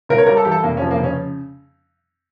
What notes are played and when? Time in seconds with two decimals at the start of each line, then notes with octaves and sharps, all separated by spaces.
0.09 C#2 A#4
0.18 C#5
0.26 G3 A#4
0.37 A4
0.45 E3 G4
0.51 A4
0.63 F1 A#3
0.77 C#4
0.81 F3
0.91 A#3
0.99 C#3 C#4